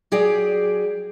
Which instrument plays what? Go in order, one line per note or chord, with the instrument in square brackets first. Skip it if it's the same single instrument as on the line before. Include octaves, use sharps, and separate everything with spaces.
[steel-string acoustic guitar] F#3 G4 G#4 D5